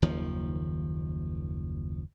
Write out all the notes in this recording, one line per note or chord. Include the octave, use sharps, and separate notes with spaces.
F#1 D#2 D#3 F3